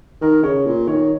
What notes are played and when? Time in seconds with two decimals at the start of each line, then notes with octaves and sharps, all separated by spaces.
0.21 D#3 A#4
0.43 C#3 C#5
0.66 A#2
0.87 D#3 C#5